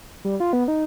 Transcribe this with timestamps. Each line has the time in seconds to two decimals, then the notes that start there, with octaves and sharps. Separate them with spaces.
0.24 G3
0.40 F4
0.53 B3
0.68 D#4